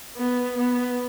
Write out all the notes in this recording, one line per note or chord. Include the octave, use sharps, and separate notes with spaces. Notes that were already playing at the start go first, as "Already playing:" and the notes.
B3
B3